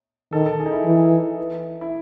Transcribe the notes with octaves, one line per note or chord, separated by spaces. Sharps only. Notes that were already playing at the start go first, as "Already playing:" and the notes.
D#3 A4
A4
G#4
D#4
E4
E3 E4
E4